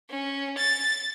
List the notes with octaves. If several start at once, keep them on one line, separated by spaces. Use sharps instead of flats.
C#4
A6